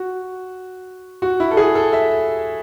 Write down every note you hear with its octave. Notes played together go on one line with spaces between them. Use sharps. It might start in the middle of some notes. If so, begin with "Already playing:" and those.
Already playing: F#4
F#4
E4
A4
G#4
A4
E5